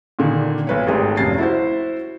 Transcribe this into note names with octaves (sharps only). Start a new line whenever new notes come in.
A#2 D3 D#3
B1 B4 C#5
G#1 G#2 A3 G4 G#4
F1 D#2 G3 C#4 A6 C7
E4 F#4 C5